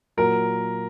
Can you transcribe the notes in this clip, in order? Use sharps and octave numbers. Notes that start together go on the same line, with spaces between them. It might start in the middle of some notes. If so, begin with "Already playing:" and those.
A#2 F#3 A#4